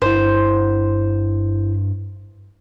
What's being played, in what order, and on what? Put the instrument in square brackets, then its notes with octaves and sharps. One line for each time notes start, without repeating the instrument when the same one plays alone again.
[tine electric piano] G1 E4 [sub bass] G2 [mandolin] C5